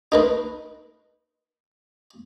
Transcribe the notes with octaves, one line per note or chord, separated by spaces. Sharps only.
D#4 A#4 B4